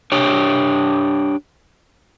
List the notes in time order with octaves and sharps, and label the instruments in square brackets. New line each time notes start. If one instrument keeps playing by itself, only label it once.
[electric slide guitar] D4 G4 C#5